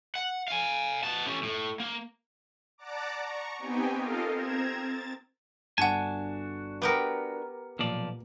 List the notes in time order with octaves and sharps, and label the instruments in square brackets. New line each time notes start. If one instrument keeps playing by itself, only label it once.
[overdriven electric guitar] F#5
F5 G#5
B3 A5
C#4 G4
A2
A#3
[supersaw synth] D5 F#5 A5 A#5 D6
A#5 C#6
B3 C4 D#4 G4 G5 G#5
F4 A4 A#4 D#5 F5
C4 A#5 G#6 E7
A6
[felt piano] G1 [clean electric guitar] D4 F#4 G#5 [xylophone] F#5 A5
[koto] B3 G4 A#4 [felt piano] D6 C#7
[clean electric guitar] B1 F3 D5 [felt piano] A#2